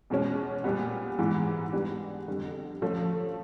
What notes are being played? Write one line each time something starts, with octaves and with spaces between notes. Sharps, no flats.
E2 B2 G#3 C#4
A#2 G3 B3
G#2 E3 G#3 B3 E4
G3 B3 D4 G4
F2 D3 G3
F3 A3 C#4